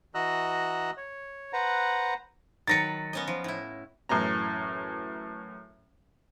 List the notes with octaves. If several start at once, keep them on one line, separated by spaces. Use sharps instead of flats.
E3 F#4 D#5 A#5 E6 F#6
C#5
B4 C5 F#5 A#5
D#3 F#3 B4 A6 A#6 C#7
B3 C#4 D#5
F3
A2 E4
F#2 A2 E3 C#4 A#5